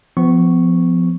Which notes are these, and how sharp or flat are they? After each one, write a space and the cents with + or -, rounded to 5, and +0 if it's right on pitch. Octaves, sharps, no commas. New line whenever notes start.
F3 +0 B3 +35 C#6 -5